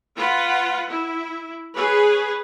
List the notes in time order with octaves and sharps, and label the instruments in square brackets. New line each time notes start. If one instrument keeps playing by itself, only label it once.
[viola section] F4 B4 F#5
E4
G#4 B4 C#5